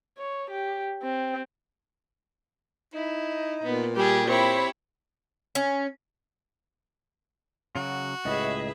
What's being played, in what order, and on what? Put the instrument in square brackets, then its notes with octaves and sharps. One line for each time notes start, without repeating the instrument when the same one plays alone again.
[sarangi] C#5
G4
C4
[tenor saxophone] D#4 [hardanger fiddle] E4
[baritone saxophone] A#2 [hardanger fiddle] B3
[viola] G3 [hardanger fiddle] G4 G#4
[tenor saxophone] C4 [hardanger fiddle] E4 G4 [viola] C#5 B5
[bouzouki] C#4
[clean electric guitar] C#3 F#3 [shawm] F#4
[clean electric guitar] C#2 A2 [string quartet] G#4 B4 E5 [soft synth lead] D#5